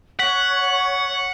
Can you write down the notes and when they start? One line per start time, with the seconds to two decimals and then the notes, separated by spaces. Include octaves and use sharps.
0.19 C#5 F#5 C#6 B6 F#7